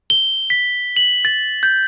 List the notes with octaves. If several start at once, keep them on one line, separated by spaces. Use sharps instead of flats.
G7
B6
F#7
A6
G6